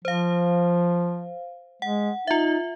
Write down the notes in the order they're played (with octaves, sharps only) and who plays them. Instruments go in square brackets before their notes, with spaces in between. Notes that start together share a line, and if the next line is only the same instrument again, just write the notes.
[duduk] F3 [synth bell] C5 F5
[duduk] G#3 [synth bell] F#5
[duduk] D#4 [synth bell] F4 E5